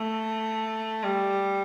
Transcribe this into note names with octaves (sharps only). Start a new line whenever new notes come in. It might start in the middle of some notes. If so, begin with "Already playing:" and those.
Already playing: A3
G3